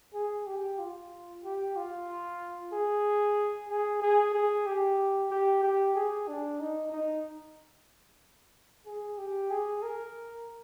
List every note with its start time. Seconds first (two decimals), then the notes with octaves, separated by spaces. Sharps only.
0.14 G#4
0.46 G4
0.79 F4
1.44 G4
1.76 F4
2.73 G#4
3.69 G#4
4.01 G#4
4.34 G#4
4.66 G4
5.31 G4
5.63 G4
5.95 G#4
6.28 D4
6.60 D#4
6.92 D#4
8.86 G#4
9.18 G4
9.50 G#4
9.83 A#4